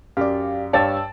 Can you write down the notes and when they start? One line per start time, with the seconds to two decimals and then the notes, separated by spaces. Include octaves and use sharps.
0.17 F#2 G4 D5 F5
0.73 G2 C#5 D5 F5 G5 A5 E6 A6